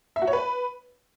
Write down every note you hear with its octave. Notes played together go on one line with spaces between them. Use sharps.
E5
F#4
C#5
B4